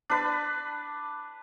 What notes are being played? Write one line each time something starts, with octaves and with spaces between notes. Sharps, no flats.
D4 B4